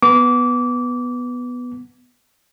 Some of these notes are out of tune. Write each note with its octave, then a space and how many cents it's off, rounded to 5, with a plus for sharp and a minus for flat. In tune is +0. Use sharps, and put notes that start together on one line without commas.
B3 +0 D6 -20